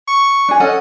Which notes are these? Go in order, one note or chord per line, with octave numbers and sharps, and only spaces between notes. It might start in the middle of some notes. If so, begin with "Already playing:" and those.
C#6
D4 G#4
C#4 A4 D#5 F#5